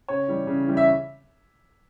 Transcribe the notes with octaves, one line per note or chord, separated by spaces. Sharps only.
C#3 C#5
E3 G3
C#3
E3 G3
E5